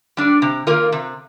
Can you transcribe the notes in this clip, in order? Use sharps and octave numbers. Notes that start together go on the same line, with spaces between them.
G3 D4
C3
D#3 A#3 F4 A#4
C3